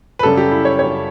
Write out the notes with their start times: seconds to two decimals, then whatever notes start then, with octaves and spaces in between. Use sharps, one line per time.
0.19 B4
0.23 F#2 C#3 G3 A4
0.37 G4
0.51 E4
0.65 C#5
0.79 F#2 C#3 G3 C#5